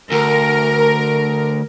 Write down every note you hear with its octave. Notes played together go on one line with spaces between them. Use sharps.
D2 A#4